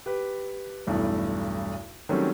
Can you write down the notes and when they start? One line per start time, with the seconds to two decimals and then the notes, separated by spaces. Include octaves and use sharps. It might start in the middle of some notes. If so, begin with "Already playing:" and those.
0.06 G4 B4
0.87 B1 E2 G2 E3 A3
2.09 D#3 F#3 G3 A3 C4 C#4